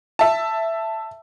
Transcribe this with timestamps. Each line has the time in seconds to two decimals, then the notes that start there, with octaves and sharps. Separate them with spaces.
0.19 E5 A5